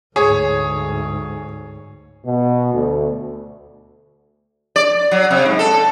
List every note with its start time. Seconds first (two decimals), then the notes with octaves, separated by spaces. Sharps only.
0.16 D2 G#2 G#4 C#5
2.24 B2
2.74 D2
4.76 D5
5.12 F#3
5.31 C3
5.45 G#2
5.59 A4